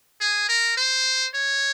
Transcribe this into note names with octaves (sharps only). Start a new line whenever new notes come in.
G#4
A#4
C5
C#5